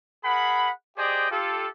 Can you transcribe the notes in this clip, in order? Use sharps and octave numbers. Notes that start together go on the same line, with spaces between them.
G#4 A#4 F#5 B5
G4 G#4 C5 D5 D#5 G5
F4 G4 A4